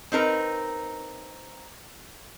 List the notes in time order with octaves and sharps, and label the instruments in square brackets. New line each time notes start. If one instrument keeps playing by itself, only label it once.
[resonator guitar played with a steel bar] C4 D#4 A#4 B4